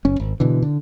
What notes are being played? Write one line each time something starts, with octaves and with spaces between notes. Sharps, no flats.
F#1 C#4
G#1
B2 D3 E3
D3